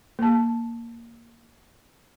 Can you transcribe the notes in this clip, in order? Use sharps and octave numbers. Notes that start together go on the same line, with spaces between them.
A#3 A5